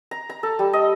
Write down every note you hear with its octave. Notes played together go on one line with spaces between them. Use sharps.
A#5
A#5
A4
G3
D#5